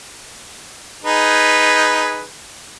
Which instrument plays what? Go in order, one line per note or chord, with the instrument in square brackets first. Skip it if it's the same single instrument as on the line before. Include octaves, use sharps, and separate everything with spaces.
[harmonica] D#4 G#4 B4